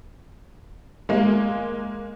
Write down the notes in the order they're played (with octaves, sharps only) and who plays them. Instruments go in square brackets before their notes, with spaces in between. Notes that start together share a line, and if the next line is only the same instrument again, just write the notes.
[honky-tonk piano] G#3 A#3